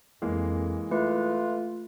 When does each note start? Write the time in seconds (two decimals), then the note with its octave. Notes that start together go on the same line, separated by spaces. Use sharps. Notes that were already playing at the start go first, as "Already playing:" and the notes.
0.22 F2 E3 G#3 A#3
0.91 A3 F4 B4